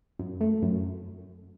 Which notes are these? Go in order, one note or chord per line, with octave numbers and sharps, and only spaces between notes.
F#2
A3
F#2